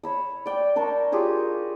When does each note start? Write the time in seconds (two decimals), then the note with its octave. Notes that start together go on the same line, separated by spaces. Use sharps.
0.03 C#5 B5 E6
0.46 D5 G5
0.76 D4 A#4 A5 C#6
1.12 F4 G4 G#4 C#5